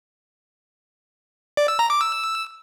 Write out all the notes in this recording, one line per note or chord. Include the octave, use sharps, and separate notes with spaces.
D5
E6
A#5
D6
E6